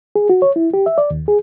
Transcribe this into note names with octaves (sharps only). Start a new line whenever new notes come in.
G#4
F#4
C#5
E4
G4
E5
D5
D#2
G#4